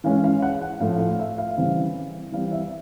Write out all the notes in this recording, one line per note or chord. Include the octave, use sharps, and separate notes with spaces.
E3 G#3 C#4 F5
F5
F#5
F#5
A2 F3 A3 F5
F5
E5
F5
C#3 E3 G3 C4
E3 G3 C4 F5
E5